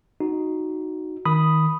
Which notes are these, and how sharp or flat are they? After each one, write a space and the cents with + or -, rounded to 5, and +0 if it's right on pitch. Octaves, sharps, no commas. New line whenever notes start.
D#4 +0 F#4 +0
D#3 +15 B5 +0 D#6 +0